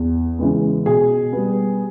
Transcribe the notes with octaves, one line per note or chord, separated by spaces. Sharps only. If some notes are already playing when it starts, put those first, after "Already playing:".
Already playing: E2
C#3 E3 G#3 B3
B2 G#4
G3 B3